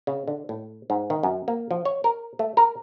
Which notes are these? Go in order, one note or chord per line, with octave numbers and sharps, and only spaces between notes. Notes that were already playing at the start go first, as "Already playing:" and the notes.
C#3
D3
A2
G#2
D#3
F#2
A#3
F3
C#5
A#4
A3
A#4